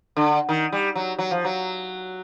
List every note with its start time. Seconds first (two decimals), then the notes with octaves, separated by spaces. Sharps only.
0.17 D3
0.49 D#3
0.73 G3
0.95 F#3
1.19 F#3
1.31 F3
1.45 F#3